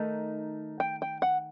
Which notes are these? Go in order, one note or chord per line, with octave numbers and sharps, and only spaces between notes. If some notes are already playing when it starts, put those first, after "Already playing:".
Already playing: D#3 A3 D#4
G5
G5
F#5